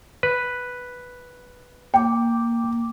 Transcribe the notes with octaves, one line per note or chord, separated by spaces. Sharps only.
B4
A#3 G5 D6